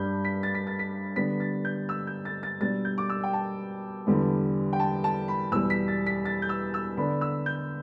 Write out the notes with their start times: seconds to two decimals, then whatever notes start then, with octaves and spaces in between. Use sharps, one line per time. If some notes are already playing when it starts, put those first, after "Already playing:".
Already playing: G2 G3 D4 B5 G6
0.25 B6
0.43 A6
0.55 B6
0.67 A6
0.79 B6
1.16 D3 G3 B3 D4 B6
1.40 A6
1.65 G6
1.89 E6
2.07 G6
2.25 A6
2.43 A6
2.61 B2 G3 D4 A6
2.85 G6
2.98 D6
3.10 E6
3.23 G5
3.33 A5
4.06 E2 D3 G3 B3
4.73 G5
4.80 A5
5.04 A5
5.28 B5
5.52 E2 B2 G3 E6
5.70 B6
5.88 A6
6.06 B6
6.25 A6
6.42 G6
6.49 E6
6.74 E6
6.97 D3 B3 D4 B5
7.21 E6
7.46 G6